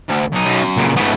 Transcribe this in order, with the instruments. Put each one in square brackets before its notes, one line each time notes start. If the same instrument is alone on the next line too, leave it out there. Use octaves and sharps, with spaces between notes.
[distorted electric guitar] D2
B1 D#4
[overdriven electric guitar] F#2
[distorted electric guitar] A#2 C#3
[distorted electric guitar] G#2 B3 [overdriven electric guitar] C#3 A3